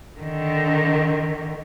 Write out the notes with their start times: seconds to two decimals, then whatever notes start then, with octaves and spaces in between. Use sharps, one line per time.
0.20 D3 D#3